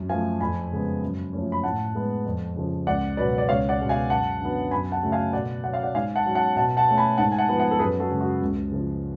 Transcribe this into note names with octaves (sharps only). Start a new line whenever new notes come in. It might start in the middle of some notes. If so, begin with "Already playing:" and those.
Already playing: F#2
F3 A3 F5 G#5
F2 G#5 B5
C#3 G#3 B3
F#2
F3 A3 C#4
B5
A2 F#5 A5
G#3 B3
F2
C#3 F3
C#2 D5 F#5
B2 F#3 B4 D5
D5
C#2 C#5 F5
D5 F#5
B2 G#3 C#4
F5 G#5
F#2 F#5 A5
D3 F#3 B3
F#2 G#5 B5
F#5 A5
C#3 F#3 A3 C#4
F5 G#5
B2 D5 F#5
F#3 C#4 F#5
F5
D5 F#5
G#2 F5 G#5
F#5 A5
F#3 C#4
F#5 A5
B2 F#5 A5
F#5 A5
A3 C#4
G#5 B5
G#2 F#5 A5
G#5
F#5 A5
F3 B3
F#5 A5
A4
F#2 G#4 B4
F#4 A4
C#3 G#3
F#4
C#2
C#3 F3